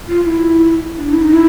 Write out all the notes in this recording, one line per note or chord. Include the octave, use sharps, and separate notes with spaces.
F4
F4
E4
D4
E4
D#4
E4